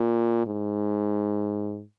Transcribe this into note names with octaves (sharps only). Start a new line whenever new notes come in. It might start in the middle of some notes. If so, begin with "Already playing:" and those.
Already playing: A#2
G#2